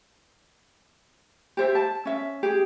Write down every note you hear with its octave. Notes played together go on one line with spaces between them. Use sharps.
G4 C5 E5
A5
C#4 E5
G4 G#4